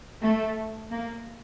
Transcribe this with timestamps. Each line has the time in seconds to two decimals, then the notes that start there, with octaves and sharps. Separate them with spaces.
0.21 A3
0.91 A#3